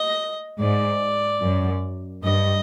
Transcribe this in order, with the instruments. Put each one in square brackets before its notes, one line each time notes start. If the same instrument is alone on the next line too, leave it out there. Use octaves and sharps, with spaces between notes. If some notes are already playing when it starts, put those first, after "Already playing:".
Already playing: [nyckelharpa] D#5
[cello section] G#2 [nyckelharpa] D5
[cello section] F#2
[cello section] G2 [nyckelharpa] D#5